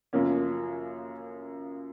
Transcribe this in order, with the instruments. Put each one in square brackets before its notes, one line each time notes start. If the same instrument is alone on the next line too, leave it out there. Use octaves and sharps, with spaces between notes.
[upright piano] F#2 C#3 F3 A#3 C#4